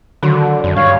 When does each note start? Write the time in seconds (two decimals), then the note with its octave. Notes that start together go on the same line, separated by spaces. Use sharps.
0.23 D3 D#3 F#3 F#4
0.64 F#2
0.76 G2 C#5 F5